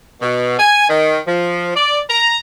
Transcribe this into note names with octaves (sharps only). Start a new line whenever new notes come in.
B2
G#5
D#3
F3
D5
A#5